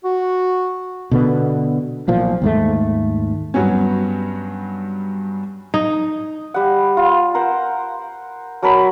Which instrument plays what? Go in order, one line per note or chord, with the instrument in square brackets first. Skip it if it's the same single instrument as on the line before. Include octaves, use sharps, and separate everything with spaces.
[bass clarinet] F#4
[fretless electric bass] B2 D3 B3
B1 A#2 F3
D#2 G#2 A3
[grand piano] G2 F#3 B3 C#4
[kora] D#4
[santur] G3 F#5
F4
A#4 C5 F#5
F#3 A#4 A5 B5